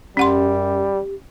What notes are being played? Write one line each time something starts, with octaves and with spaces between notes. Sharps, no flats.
F#2 G3 C#4 G4 F#5 C6